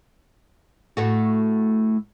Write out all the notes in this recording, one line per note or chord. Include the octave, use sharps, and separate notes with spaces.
A2 A3 F#4